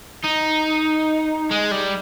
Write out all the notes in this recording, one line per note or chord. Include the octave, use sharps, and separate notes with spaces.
D#4
G#3
G3